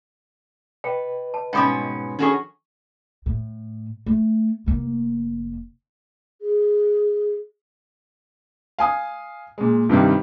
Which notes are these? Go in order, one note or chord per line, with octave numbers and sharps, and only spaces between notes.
B4 D#5 G5
A5
G#2 B2 C#4 G5 B5 D#6
D#3 C#4 D4 F#4 G#4 A4 B5 C#6
A2
A3
F1 A#3
G#4
F5 G#5 D#6
A#2 G#3
G2 C3 D#3 G3